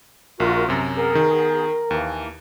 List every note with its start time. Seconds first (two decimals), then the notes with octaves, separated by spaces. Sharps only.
0.40 A#1 F4 F#4 A#4
0.68 F#2 C3 A#5
0.97 B3 G#4 A#4
1.15 D#3
1.91 D#2 E3 A#3